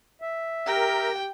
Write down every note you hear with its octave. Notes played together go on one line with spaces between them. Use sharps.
E5
G4 A#4 G5